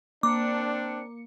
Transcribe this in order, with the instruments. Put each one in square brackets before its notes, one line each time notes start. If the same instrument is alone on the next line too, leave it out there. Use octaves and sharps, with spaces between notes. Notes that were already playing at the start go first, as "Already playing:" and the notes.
[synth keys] A#3 C#7 [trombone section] C4 D4 [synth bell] D6